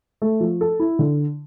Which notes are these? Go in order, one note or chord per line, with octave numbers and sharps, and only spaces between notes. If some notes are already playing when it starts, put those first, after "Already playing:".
A3
F3
A4
E4
D3